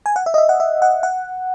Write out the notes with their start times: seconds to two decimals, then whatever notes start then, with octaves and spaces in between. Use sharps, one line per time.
0.06 G#5
0.16 F#5
0.26 E5
0.34 D#5
0.38 E5
0.49 F#5
0.60 E5
0.82 F#5
1.03 F#5